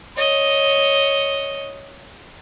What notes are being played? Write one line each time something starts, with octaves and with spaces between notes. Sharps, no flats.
C#5 D#5